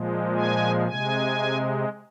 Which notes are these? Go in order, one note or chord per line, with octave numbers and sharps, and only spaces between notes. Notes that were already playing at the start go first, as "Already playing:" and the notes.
Already playing: A#2 F3 G#3
G#5
C3 G#3 G#5